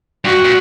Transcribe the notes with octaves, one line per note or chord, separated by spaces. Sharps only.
G2 F#4
A#2